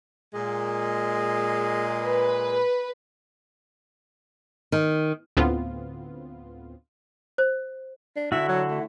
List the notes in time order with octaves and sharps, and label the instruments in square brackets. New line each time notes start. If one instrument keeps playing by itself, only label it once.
[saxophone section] A#2 G#3
[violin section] B4
[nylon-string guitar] D#3
[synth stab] D2 A2 B3 C4 F4
[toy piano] C5
[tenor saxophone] D4
[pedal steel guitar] D3 E4 F#4 [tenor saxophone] E5
[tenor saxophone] F#3
A3